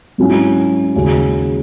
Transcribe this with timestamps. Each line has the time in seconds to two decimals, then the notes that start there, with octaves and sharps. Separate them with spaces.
0.18 G#2 F#3 C#4 E4
0.95 D#2 C#3 G#3 C#4 F#4